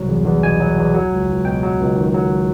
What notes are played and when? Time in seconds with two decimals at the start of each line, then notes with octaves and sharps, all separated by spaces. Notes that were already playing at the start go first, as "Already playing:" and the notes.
Already playing: C2 F#3
0.08 E2
0.25 E2
0.43 B2 G#5
0.60 F#3
0.77 E2
0.94 F#3
1.12 C#2
1.29 C#2
1.45 B2 G5
1.63 F#3
1.80 C#2
1.96 D#3
2.14 F#3